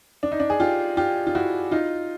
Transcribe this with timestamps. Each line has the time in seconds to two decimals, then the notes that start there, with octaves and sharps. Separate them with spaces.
0.23 D4
0.32 D#4
0.40 D4
0.50 G#4
0.60 F4 G4
0.97 F4 G4
1.27 F4
1.35 E4 F#4
1.72 D#4 F4